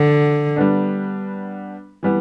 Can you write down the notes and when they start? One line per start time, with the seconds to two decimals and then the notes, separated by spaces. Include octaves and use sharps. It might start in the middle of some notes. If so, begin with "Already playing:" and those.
Already playing: D3 F#4
0.56 G3 B3 D4
2.03 E3 G3 B3